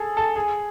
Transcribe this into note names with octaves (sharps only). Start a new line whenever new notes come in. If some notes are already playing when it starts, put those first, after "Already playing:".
Already playing: G#4 A4
A4
G#4